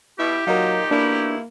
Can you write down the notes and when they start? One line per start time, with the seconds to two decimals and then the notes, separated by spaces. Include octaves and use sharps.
0.19 B2 E4 G4
0.47 A#2 F#3 D#4 A#4 D#5 F5
0.91 G#2 B2 A#3 D4 E4